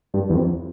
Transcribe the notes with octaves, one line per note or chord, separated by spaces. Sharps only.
G2
E2
F2